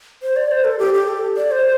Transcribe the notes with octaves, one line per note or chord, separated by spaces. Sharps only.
C5
D5
C5
A4
G4
G4
A4
D5
C5